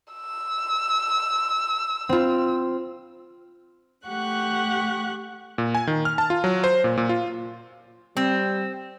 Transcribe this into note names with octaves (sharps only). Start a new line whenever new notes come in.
E6
C4 F4
A3 G4 F#5 C#6 F#6
A#2
G#5
D#3
F6
A5
F4
F#3
C5
A#2
A#2
F4
G3 C4